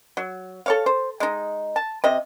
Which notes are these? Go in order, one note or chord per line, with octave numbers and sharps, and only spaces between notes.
F#3
A4 C#5 F5
C5
G#3 D#4
A5
C3 D#5